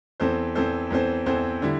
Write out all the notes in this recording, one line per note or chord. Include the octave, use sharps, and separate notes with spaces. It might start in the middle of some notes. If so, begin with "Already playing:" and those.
E2 E3 C4 A4 C5
E2 E3 C4 A4 C5
E2 E3 C4 A4 C5
E2 E3 C4 A4 C5
D3 G3 E4